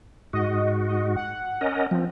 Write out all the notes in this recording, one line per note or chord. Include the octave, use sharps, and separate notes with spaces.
G#2 F#4 D#5
D#5
F#5
C#4 A#4 D#5
F3 C4